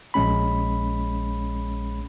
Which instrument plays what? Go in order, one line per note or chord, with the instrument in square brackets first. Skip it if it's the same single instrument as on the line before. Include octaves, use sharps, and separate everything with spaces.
[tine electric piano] A#1 G#3 C#4 B5